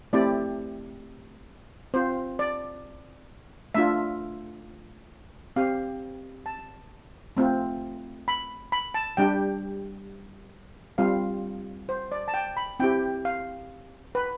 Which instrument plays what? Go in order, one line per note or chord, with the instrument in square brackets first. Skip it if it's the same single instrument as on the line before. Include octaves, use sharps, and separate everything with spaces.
[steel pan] A3 C4 E4 G4 D5
C4 F4 C5
D5
A3 D4 F4 E5
C4 G4 F5
A5
A3 C4 F4
B5
B5
A5
G3 D4 G4 G5
G3 C4 F4 F5
C5
D5
A5
G5
B5
C4 E4 G4 G5
F5
B4